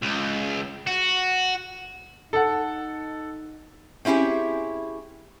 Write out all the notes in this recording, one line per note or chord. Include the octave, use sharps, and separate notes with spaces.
C#2
F#4
D#4 A4 F#5
C4 C#4 E4 G4 G#4